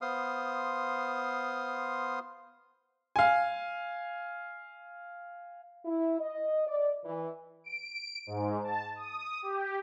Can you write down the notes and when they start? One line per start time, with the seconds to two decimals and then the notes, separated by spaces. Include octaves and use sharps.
0.02 B3 C5 F5 C6 D#6
3.16 F5 G#5
5.85 E4
6.20 D#5
6.67 D5
7.05 E3
7.64 D7
8.27 G#2
8.63 A5
8.95 D#6
9.43 G4